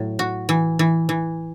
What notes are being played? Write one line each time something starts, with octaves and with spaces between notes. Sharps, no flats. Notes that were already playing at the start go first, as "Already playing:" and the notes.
Already playing: A2 F#3
F#4
E3
E3
E3